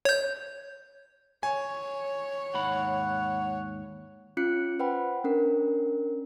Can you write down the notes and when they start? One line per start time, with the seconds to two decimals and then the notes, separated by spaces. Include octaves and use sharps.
0.05 C#5 G6
1.43 C#5 G#5
2.54 D#2 G#2 F#5 B5
4.37 C#4 F4 F#6 C#7
4.80 B4 C5 F#5 G5 B5
5.24 C#4 D4 A#4